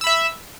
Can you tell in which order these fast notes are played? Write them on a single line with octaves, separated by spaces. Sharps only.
E6 B5 E5